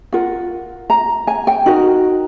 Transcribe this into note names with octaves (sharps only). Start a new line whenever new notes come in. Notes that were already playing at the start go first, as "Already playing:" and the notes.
F4 A#4 F#5
A#5
G#5
G5
D#4 F#4 A#4 D#5